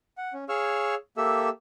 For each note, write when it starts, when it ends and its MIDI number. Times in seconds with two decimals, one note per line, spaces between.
0.18 0.33 78
0.33 0.44 61
0.49 0.95 68
0.49 0.95 73
0.49 0.95 77
0.49 0.95 85
0.49 0.95 88
0.49 0.95 89
1.17 1.49 58
1.17 1.49 67
1.17 1.49 69
1.17 1.49 76
1.17 1.49 88